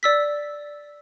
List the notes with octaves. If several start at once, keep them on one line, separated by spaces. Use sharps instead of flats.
D5 E6 B6